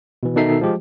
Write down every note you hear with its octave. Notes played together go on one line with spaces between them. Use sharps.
B2 E3
B2 D#3 D#4 A4 E5 C7
F3 G#3 G4